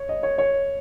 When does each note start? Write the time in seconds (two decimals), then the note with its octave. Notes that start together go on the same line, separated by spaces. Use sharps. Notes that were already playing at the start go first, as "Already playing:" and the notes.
Already playing: C#5
0.09 D#5
0.23 C#5
0.38 C#5